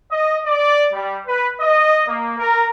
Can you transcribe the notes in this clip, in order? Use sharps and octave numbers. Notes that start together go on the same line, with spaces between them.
D#5
D5
G3
B4
D#5
A#3
A#4